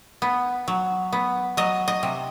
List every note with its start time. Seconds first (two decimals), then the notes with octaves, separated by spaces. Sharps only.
0.22 B3
0.68 F#3
1.13 B3
1.57 F#3 D#5
1.88 D#5
2.03 C3